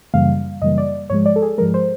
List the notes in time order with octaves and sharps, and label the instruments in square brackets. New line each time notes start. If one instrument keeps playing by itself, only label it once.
[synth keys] F#2 C#3 E3 G3 A#3 F5
F#2 C#3 E3 G3 A#3 D#5
D5
G#2 F3 G#3 C#5
D5
A4
G#4
G#2 F3 G#3 A#4
C5